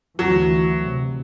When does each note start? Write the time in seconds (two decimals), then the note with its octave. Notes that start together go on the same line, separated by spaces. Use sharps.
0.19 D2 E3 F#3
0.86 C3